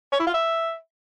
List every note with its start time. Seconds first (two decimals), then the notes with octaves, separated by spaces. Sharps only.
0.12 C#5
0.19 E4
0.27 F4
0.34 E5